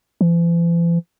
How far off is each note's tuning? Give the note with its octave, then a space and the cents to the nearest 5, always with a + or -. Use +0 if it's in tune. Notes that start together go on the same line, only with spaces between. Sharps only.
E3 +45